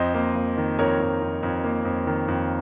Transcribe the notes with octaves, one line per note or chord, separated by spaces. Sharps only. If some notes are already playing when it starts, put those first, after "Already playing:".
Already playing: F2 C5 D#5
A#3
A#3
D#3
F2 A#4 C#5
F2
F2
F2
A#3
F2
D#3
F2